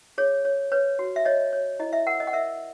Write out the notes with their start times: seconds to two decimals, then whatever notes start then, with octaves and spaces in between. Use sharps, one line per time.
0.18 G#4 C#5
0.45 C#5
0.72 B4 C#5
0.99 F#4
1.16 E5
1.25 C#5 D#5
1.53 C#5
1.79 E4 D#5
1.93 E5
2.07 A#4 F#5
2.20 D#5
2.27 F#5
2.33 A#4 E5